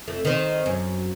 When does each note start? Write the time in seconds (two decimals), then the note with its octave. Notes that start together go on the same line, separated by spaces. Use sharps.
0.08 F2 A3
0.25 D#3 C4
0.66 F#2